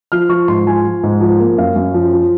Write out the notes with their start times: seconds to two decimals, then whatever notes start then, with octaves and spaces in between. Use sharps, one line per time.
0.12 F3 F6
0.29 F3 C#6
0.48 G#2 C6
0.66 F3 G#5
0.85 F3
1.04 G#2
1.21 F3
1.40 A#3
1.58 F#2 F5
1.76 F#2
1.94 F3
2.13 F3